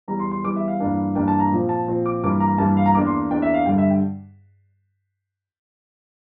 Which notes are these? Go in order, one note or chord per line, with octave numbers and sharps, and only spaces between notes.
E2 E3 G3 A#5
C6
C6
E2 E3 G3 D6
E5
F5
G2 E3 A#3 D4
G2 E3 A#3 D4 G5
A5
A#5
A#2 F3 C4
A5
A#2 F3 C4
D6
G2 E3 A#3 D6
A#5
G2 E3 A#3 A5
F5
A#5
E2 E3 A#3 D4 D6
C6
E2 E3 A#3 D4 G5
E5
F5
G2 D3 G3 G5
E5
G5